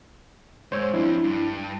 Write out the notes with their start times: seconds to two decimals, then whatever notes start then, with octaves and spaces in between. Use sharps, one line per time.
0.72 G#2 G#3 C5 C#5 E6
0.94 F2 C4 D4 E4
1.24 G2